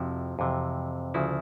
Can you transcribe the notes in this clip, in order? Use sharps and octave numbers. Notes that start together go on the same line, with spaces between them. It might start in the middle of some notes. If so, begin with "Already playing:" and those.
Already playing: F2 C3 F3 E4 F#4
F2 C3 E3
D2 C#3 F3 E4 F#4